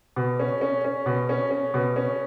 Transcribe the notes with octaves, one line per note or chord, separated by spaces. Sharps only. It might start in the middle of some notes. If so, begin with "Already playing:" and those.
B2
C#4
C#4
C#4
B2
C#4
C#4
B2
C#4